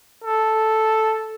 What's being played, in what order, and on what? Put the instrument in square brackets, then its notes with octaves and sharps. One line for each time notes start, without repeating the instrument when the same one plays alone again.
[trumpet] A4